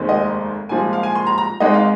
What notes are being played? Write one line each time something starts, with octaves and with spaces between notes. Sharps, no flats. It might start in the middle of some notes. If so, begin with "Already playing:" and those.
Already playing: F1 D#2 D#3 G#3 C4
D#5
C2 A#2 F3 G#3 G#5
F5
G#5
C6
A#5
A#5
G#1 G#2 G#3 D#4 D#5
F5